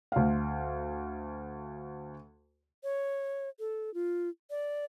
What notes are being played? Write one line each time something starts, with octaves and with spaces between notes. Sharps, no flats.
D2 F5
C#5
A4
F4
D5